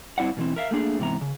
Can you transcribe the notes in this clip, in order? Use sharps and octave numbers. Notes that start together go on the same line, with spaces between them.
G2 C4 E4 D5 F#5
B2 E3 C4
A#4 E5 F5
A3 A#3 D4 G#4
G#2 C3 E3 B3 A#5
C#3